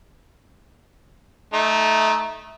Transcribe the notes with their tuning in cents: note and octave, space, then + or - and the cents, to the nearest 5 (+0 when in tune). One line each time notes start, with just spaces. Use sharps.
A3 -15 D#4 +0